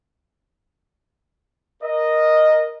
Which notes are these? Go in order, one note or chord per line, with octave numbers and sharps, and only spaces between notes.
A#4 D#5